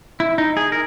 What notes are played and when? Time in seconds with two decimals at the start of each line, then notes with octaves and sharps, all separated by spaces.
0.20 E4
0.38 D#4
0.57 G#4
0.72 A#4